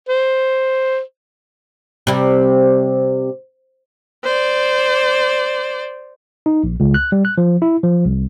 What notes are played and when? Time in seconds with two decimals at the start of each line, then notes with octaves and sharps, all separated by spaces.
0.09 C5
2.07 C3 G3
4.24 C5 D5
6.46 D#4
6.64 A#1
6.80 C#2
6.94 F#6
7.12 G3
7.25 F#6
7.38 F3
7.62 E4
7.83 F3
8.05 C2